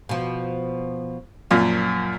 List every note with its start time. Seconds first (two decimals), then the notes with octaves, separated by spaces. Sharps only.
0.09 B2 F3
1.51 F#2 A#2 F3 F4